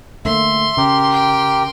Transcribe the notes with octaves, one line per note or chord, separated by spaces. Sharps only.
D3 A3 A#3 E5 C6
C#3 G4 A#4
G5 C6